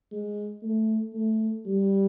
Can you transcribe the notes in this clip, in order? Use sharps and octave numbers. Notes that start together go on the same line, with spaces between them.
G#3
A3
A3
G3